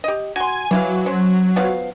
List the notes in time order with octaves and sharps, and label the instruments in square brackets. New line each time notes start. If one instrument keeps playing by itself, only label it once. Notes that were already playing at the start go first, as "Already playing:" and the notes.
[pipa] G4 D#5
[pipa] F#4 C6 [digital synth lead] G#5
[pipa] E3 E4 F5 [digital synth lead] F#3
[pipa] C#4 C5
F3 B3 F5